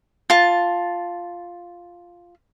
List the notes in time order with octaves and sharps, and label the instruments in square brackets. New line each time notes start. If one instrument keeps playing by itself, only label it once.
[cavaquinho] F4 A5